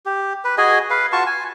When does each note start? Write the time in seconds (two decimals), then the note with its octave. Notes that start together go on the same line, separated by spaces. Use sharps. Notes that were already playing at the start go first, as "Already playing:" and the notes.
0.06 G4
0.45 B4
0.58 F#4 G#4 D#5 G#5
0.90 B4 F5
1.12 F4 F#4 A5 C#6
1.26 G#5